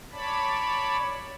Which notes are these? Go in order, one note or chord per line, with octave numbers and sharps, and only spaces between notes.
C#5 D5 A5 B5